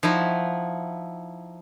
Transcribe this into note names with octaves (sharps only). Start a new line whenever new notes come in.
F3 D#4 E4 F#4